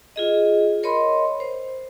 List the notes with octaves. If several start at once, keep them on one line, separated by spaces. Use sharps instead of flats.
F4 G#4 D#5
A#4 C#5 D#5 B5 C6
C5